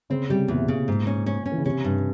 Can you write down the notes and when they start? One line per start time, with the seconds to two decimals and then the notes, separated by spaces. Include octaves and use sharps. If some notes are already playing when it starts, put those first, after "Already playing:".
0.10 C#3 C4
0.29 C3 G3
0.48 E2 A#2
0.68 C#3
0.88 G#2
1.07 C#4
1.26 C#4
1.46 C#4
1.52 E3
1.58 C#3
1.65 C3 C#4
1.84 G2